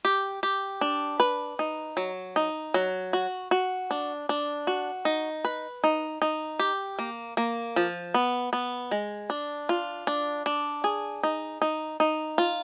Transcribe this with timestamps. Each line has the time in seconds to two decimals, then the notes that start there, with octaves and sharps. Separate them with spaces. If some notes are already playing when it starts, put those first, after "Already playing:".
0.05 G4
0.43 G4
0.81 D4
1.20 B4
1.59 D#4
1.97 F#3
2.36 D#4
2.74 F#3
3.13 F#4
3.51 F#4
3.91 D4
4.29 D4
4.67 F#4
5.05 D#4
5.44 B4
5.84 D#4
6.22 D#4
6.59 G4
6.99 A#3
7.37 A#3
7.76 F3
8.14 B3
8.53 B3
8.91 G#3
9.30 D4
9.69 F4
10.07 D4
10.46 D4
10.84 G#4
11.23 D#4
11.62 D#4
12.00 D#4
12.38 F4